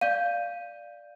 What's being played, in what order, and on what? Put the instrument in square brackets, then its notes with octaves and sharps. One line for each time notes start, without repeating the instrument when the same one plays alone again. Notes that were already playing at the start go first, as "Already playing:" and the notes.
[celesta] D5 G6 D#7 [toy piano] F5